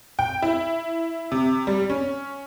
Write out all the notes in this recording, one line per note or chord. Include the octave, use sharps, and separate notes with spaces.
G5
E4
C3
G3
C#4